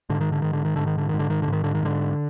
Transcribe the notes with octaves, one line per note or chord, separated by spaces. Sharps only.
G#2 D3
D#3
D3
G#2 D#3
D3
D#3
G#2 D3
D#3
D3
G#2 D#3
D3
D#3
D3
G#2 D#3
D3
D#3
G#2 D3